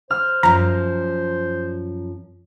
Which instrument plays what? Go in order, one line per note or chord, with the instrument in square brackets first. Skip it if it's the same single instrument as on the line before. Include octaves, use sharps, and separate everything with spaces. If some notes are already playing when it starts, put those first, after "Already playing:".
[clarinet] C5 [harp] F6
[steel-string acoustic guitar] F#2 F3 [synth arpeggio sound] A#5